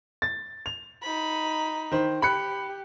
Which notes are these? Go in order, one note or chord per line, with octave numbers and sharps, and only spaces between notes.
A6
F7
D#4 B5
D#3 C5
G4 B5 F#6 C#7